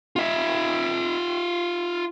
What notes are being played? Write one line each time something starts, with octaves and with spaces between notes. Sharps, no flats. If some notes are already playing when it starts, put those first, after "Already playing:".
F4 E5